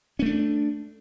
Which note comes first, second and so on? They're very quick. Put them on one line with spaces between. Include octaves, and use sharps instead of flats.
C#4 A3 D4